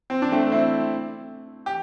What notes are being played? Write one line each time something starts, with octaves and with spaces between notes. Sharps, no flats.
C4
D4
A3 C4
C4 E4
G4